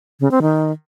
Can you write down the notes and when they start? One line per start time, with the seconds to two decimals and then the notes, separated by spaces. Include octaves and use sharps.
0.20 C#3
0.31 C4
0.42 D#3